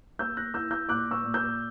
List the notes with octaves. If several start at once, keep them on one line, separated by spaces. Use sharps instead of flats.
A#3 E6 G6
F#6 A#6
E4 E6 G6
E6 G6
A#2 D6 F#6
C#6 E6
A#2
E6 G6